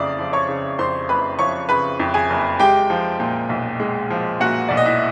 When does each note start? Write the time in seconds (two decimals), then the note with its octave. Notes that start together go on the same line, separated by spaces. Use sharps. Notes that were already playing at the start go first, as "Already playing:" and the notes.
Already playing: F#1 F2 C#3 D5 D6 D#6
0.19 F3
0.33 C#5 C#6
0.48 C#3
0.79 F2 C5 C6
1.08 F#1 B4 B5
1.39 F3 C#5 C#6
1.69 C#3 B4 B5
2.00 F2
2.14 G#4 G#5
2.30 F#1
2.60 G#3 G4 G5
2.90 F3
3.20 A#2
3.49 B1
3.80 G#3
4.10 F3
4.40 A#2 F#4 F#5
4.69 B1 D5
4.77 D#5
4.86 E4 E5